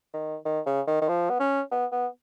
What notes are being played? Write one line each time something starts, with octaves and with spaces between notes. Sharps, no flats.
D#3
D#3
C#3
D#3
D#3
F3
B3
C#4
B3
B3